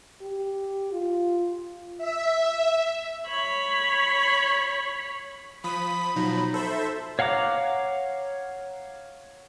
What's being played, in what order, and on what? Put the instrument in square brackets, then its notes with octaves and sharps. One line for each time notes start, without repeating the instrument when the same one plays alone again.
[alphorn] G4
F4
[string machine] E5
[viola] C#5 B5
[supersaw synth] F3 D#6 B6 [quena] B5
[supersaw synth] B2 F3 F#3 [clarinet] D#4
[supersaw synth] A4 C5 E5
[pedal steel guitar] C#5 F5 F#5 A#5 D6